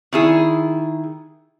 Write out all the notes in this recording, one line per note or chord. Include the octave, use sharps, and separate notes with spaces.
D#3 E4 G#4